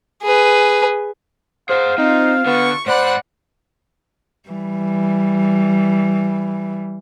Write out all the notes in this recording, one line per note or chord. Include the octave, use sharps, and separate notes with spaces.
G#4 B4
G#4 C5 F5 F#5
C4 D#4 F4 C5
D3 B3 C#6
G#2 C5 D5 F#5 B5 F#6
E3 G3